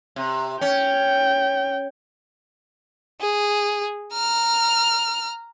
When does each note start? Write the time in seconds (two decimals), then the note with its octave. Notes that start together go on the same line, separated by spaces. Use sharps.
0.16 C3
0.61 C#4 G5
3.21 G#4
4.14 A#5 F6